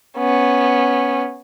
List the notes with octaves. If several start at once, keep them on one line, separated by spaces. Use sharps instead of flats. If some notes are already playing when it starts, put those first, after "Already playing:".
B3 C#4